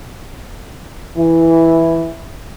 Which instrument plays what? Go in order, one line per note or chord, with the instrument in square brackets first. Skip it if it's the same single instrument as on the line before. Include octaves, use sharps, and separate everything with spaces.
[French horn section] E3 E4